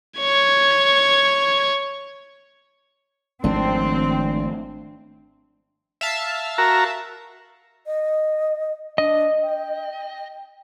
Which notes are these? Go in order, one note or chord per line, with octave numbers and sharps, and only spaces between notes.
C#5 G#6
G#1 D#3 F3 A3 C4 D4
E5 F5 A5
F#4 A#4 A#5
D#5
D4 D#5
G5